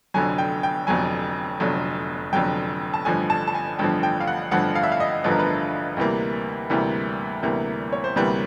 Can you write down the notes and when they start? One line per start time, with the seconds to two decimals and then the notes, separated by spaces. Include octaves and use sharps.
0.14 F1 F2 D3 F#3 G#5
0.38 G5
0.63 G5
0.87 F1 F2 D3 F#3 G#5
1.60 F1 F2 D3 F#3
2.33 F1 F2 D3 F#3 G5
2.94 A5
3.05 A1 G2 D3 F3 G#5
3.30 A5
3.47 A5
3.55 G#5
3.78 A1 G2 D3 F3 G5
4.03 G5
4.20 F5
4.27 F#5
4.51 A1 G2 D3 F3 F#5
4.75 F5
4.83 E5
4.92 F5
5.00 D#5
5.24 A1 G2 D3 F3 B4
5.31 A#4
5.39 B4
5.97 D2 C3 E3 G3 A#3
6.70 D2 C3 E3 G3 A#3
7.43 D2 C3 E3 G3 A#3
7.93 C#5
8.04 C5
8.16 D2 C3 E3 G3 A#3 B4